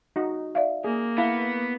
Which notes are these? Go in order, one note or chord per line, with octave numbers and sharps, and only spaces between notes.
D#4 F#4
D5 E5 F5
A#3 G#4
B3 E4 F5